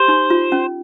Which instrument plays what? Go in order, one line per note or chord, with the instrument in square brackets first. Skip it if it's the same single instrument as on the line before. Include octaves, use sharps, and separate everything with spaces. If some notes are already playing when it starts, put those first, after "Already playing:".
Already playing: [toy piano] G4 [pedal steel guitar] C5
[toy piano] D#4
F4
C#4